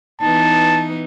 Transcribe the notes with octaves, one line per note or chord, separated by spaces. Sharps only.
E3 B3 D#4 A5